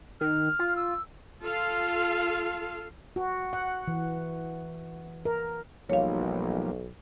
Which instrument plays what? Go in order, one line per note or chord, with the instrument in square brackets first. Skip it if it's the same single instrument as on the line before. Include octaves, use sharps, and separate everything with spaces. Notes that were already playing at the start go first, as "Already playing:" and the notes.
[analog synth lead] D#3 [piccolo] F6
[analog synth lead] F4
[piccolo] E6
[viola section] F4 A4 F5
[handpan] F#4
F#5
E3
A#4
[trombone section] B1 [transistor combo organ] F3 G3 A#3 [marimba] C#5 F5